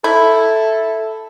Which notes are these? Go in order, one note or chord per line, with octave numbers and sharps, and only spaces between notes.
E4 A4